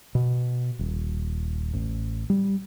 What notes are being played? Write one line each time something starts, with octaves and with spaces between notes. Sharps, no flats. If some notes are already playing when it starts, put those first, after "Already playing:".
B2
D#1
A1
G3